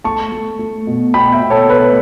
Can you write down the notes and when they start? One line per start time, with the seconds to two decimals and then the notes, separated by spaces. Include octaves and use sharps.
0.04 A3 A5 C#6
0.32 A3
0.59 A3
0.87 B2
1.14 B2 G5 B5
1.32 E5 G5
1.41 B2
1.50 A4 C#5
1.69 A3 B4